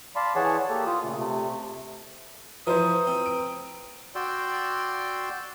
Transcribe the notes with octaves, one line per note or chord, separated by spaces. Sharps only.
D5 F5 A5 B5 C6
E3 G#4 C#5 F#5 A5
A#3 G4 A4
F4 D#6
A#2 C#3 A3
C3 A3
E3 F3 F4 B4 C5 A#5 D#6
C4
D7
F#4 D5 G5 C6 E6